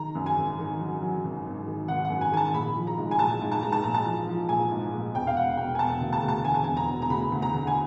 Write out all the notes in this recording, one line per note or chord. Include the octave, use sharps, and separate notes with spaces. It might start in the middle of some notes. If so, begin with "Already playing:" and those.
Already playing: D#3 A#5
F#2
G#5
G#1
D#3
F#3
F#3
G#1
G#1
D#3
G#1 F#5
F#5
F#2
G#5
D#3 G#5 A5
A#1 B5
F3
A#5
G#2
G#5
A#1 A5
G#2
A5
G#2 A#5
A5
A#1 A#5
A5
F3
F3
A#1 G#5
G#2
A#1
E1 G5
F5
E1 F#5
E1 G5
G#5
E1 A5
D2
A5
D2
A5
D3 G#5
A5
E1 G#5
A#5
E1
A#5
D2 B5
D2
A#5
D3
G#5